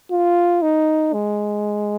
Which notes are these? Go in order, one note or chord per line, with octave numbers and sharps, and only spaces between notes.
F4
D#4
G#3